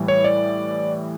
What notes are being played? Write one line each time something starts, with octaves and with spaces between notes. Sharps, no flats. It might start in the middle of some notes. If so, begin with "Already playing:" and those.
Already playing: A2 E3 G3
C#5
D5